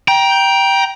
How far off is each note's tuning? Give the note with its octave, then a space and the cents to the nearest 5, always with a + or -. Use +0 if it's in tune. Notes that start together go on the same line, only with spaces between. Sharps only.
G5 +0 A#5 +25